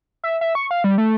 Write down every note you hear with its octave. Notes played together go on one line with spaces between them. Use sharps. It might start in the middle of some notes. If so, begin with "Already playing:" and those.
E5
E5
C#6
F5
G3
A3